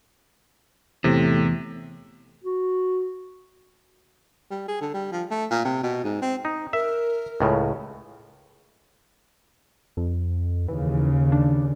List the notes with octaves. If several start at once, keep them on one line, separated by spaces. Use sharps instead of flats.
E2 A2 C3
F#4
G3
G#4
D3
G3
F3
A3
A#2
C3
B2
G#2
C4
D#4
A#4 E5
C#2 A2 C#3
F2
D#2 C#3 E3
D4